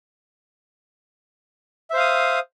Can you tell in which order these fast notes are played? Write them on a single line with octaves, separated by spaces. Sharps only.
E5 C5 F5 D#6